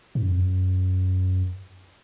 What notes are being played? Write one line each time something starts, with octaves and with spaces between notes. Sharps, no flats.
G#2
F#2
F2
F#2